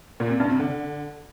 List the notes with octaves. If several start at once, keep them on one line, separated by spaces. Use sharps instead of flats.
A#2
C3
G2
C3
D3